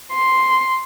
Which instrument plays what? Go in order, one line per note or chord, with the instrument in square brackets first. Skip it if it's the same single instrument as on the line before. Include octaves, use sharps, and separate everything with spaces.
[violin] C6